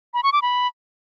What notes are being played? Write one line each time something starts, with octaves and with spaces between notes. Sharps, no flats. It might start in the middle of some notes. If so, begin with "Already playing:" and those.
B5
C#6
D6
B5